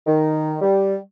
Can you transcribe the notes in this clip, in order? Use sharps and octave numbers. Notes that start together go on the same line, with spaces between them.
D#3
G3